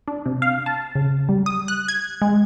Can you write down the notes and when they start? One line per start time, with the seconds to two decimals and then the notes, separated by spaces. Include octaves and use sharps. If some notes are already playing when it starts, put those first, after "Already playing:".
0.08 D4
0.26 C3
0.42 F5
0.66 A5
0.95 C#3
1.29 G3
1.46 D#6
1.68 F#6
1.88 G#6
2.21 G#3